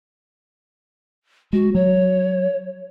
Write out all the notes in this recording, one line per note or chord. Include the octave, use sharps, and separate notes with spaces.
G#3 F#4
F#3 C#5